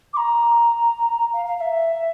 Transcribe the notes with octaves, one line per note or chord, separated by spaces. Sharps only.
D6
A#5
F5
F5
F5
E5